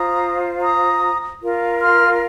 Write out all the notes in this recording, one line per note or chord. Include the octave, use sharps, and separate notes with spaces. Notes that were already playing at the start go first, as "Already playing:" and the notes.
Already playing: F4 C5 A#5 D#6
A#5 D#6
F4 A#4
C6 F6